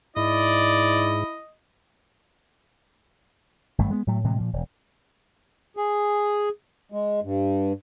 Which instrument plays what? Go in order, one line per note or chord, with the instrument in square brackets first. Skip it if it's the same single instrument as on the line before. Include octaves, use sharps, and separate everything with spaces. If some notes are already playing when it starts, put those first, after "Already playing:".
[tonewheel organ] G#2 [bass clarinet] E4 [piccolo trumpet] D5 [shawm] D#5
[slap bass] G#1 G2 A3
G#3 B3
A2 F#3 A3
A2 C3 E3 G#3
A#2 F3
E1
[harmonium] G#4
G#3
G2